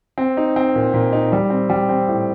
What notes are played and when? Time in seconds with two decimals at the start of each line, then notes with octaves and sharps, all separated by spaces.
0.18 C4
0.37 D#4
0.56 C4
0.75 A#2
0.94 A#2
1.13 D#4
1.32 G3
1.50 C4
1.70 G3
1.89 C4
2.08 A2